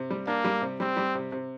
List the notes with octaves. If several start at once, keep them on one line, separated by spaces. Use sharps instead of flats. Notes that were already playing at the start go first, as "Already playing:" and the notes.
Already playing: C3
G3
A#3 D4
G3
C3
G3 C4
G3
C3
C3